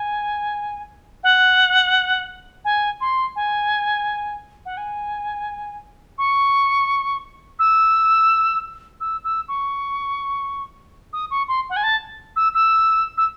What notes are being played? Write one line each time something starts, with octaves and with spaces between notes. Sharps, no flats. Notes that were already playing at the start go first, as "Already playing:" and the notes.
Already playing: G#5
F#5
G#5
C6
G#5
F#5
G#5
C#6
E6
E6
E6
C#6
D#6
C#6
C6
F#5
G#5
A5
E6
E6
E6